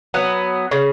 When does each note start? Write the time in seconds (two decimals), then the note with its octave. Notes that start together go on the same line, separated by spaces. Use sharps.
0.14 F#3 B3
0.71 C#3